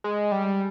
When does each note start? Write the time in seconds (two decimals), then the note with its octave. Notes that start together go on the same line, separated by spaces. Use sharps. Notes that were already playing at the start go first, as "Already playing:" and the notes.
0.04 G#3
0.32 G3